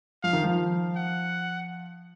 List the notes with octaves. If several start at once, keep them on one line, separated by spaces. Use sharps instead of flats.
F3 F5
D#3
F3
F#5